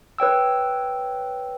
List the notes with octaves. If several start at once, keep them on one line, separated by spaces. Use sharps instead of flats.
B4 C#5 G5 E6